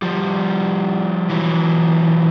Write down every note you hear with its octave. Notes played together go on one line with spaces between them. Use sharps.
F3 G3
E3 F#3